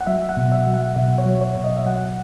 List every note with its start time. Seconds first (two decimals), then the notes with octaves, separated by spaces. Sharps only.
0.01 F#5
0.07 F#3 E5
0.29 F#5
0.37 B2
0.52 E5
0.67 F#3
0.74 F#5
0.96 B2 E5
1.18 C#5
1.26 F#3
1.41 C#5
1.56 B2
1.64 D#5
1.77 E5
1.86 F#3 F#5